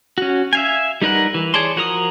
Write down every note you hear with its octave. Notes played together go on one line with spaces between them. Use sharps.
C#4 F#4
E5 F5 G#5
G3 D#4 A#4 B4 F#5
E3
G#4 C#5 D5 A5 C6
F3 F#4 A#4 A#5 D#6